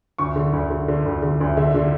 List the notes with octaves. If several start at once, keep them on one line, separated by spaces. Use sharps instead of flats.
D2 C#6
D3
D2
D3
D3
D2
D3
D2
D3 E5
D3